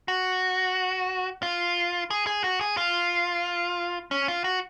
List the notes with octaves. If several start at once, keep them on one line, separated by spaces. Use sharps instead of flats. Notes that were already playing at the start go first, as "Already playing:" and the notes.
F#4
F4
G#4
G#4
F#4
G#4
F4
C#4
F4
F#4